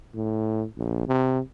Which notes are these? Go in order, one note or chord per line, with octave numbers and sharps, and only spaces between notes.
A2
A#1
C3